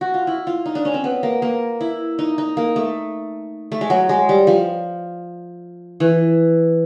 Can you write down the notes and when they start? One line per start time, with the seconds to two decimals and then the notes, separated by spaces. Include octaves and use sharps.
0.01 F#4
0.14 F4
0.27 E4
0.47 F4
0.66 D#4
0.75 D4
0.85 C#4
0.94 C4
1.04 B3
1.23 A#3
1.42 A#3
1.81 E4
2.19 D#4
2.38 D#4
2.57 A#3
2.76 A3
3.72 A3
3.81 G#3
3.90 F#3
4.09 G#3
4.29 G3
4.47 F3
6.00 E3